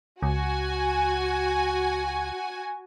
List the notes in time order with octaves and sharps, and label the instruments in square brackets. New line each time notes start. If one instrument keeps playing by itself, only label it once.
[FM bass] C#2 [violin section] F#4 G#5